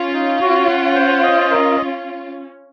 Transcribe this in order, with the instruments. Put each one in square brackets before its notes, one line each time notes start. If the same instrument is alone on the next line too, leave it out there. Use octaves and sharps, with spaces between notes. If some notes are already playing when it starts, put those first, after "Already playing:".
Already playing: [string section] C#4 F4
[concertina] D#4
F#4
F#5
C5
D#5
A#4